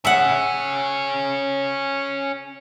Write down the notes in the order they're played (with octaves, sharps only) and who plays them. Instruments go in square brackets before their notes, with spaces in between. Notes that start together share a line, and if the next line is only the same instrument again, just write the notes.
[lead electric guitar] C#4 G#4 [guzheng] E5 F#5